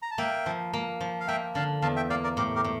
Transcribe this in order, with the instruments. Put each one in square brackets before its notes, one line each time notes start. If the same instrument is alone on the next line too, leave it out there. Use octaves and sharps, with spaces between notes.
[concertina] A#5
A5
[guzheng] A#3 [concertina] E5 G5
[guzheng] F3
A#3
F3
[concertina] F5
[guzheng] A#3 [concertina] E5 G5
[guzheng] D3 [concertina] F5 A5
[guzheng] E2 [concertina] F5 A5
[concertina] E5 G5
[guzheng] A#3 [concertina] D5 F5
[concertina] A#4 D5
[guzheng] A2 [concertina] G4 A#4
[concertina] G4 A#4
[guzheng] A2